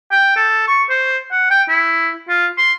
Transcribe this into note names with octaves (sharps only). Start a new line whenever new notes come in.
G5
A4
C#6
C5
F#5
G5
E4
F4
C6